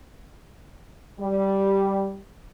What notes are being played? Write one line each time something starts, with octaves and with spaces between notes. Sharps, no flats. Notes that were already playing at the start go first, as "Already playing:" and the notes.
G3